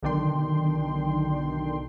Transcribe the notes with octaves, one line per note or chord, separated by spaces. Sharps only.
B1 D3 D#3 D4 G5 C6